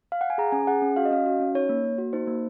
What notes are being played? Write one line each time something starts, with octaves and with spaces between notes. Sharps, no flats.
F5
F#5
G#5
G#4 A#5
C#4 G#5
G#4 F#5
C#4
F#4 F5
D#5
C#4 F5
F#4
C#4
D#4 C#5
A#3
A#3
F#4
D#4 C5
A#3